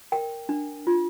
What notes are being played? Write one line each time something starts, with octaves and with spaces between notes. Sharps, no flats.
A#4 G5
D4
F4